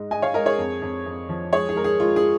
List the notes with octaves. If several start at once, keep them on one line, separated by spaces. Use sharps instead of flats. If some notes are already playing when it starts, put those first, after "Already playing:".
Already playing: G#2 G#3 D#5
G#3 D#5 G#5
C#5 F5
G#3 A#4 D#5
G#4 C#5
F2
F2
F2
F3
G#3 G#4 C#5
G#4
G#3 A#4
G#4
G#3 F4
G#4